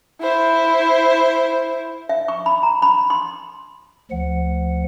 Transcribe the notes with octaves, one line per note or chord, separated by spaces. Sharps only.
E4 C5
E5
C#6
B5
A#5
B5
C6
D2 F3 F#5